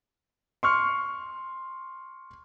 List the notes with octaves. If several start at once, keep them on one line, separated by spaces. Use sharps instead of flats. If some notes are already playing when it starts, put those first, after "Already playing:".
C6 C#6 F6